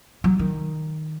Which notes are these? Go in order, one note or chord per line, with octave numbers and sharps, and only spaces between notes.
F#3
D#3